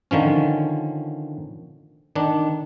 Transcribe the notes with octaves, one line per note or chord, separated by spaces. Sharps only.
D3 D#3 F3 C#4
D#3 D4